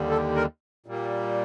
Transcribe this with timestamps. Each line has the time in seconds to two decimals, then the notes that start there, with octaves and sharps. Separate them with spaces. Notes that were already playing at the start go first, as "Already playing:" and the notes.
Already playing: D#2 D3 G3
0.10 A4
0.36 A#4
0.86 A#2 G3 A#3